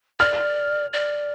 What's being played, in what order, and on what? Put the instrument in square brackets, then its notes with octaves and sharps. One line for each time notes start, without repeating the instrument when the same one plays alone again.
[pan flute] D5 [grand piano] F6
[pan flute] D5